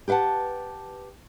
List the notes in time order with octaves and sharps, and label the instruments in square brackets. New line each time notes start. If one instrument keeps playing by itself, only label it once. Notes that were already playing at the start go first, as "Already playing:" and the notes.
[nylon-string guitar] G4 B4 F5 F#5 A5